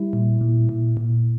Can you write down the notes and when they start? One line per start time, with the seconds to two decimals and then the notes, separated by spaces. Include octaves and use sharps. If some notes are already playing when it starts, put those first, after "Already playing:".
Already playing: G3 E4
0.13 A#2
0.41 A#2
0.69 A#2
0.97 A#2